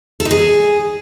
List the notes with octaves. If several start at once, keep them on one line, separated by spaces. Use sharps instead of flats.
A4
D#4
G#4